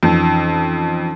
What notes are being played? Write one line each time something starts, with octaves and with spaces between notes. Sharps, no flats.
F2 E3 C#4 D#4